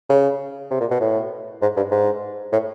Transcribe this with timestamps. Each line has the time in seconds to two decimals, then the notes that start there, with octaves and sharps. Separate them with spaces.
0.10 C#3
0.71 C3
0.80 A#2
0.91 B2
1.00 A2
1.62 G#2
1.77 G2
1.91 G#2
2.52 A2